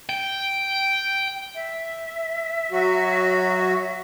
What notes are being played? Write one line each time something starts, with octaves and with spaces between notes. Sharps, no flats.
G5
E5
F#3 F#4